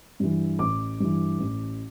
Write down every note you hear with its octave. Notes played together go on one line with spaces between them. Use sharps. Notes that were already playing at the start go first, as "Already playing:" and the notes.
G2 E3
A1 D6
G2 E3
A1